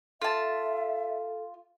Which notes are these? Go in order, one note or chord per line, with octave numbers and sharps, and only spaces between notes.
F4 A4 E5 A5